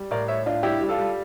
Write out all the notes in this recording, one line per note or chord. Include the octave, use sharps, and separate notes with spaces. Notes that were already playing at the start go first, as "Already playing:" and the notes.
Already playing: G3
A2 A#4 D5
A2 C#5 E5
D4 F4
G3 E4 G4
G3
F4 A4
G3